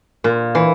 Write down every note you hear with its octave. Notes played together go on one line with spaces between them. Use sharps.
A#2
E3